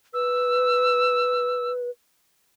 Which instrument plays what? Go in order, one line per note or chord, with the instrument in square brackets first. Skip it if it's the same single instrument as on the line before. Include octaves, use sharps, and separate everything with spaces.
[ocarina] B4 [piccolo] E6